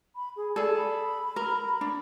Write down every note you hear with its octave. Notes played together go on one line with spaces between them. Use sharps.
B5
G#4
G#4 A4 D5
B5
A#4
D4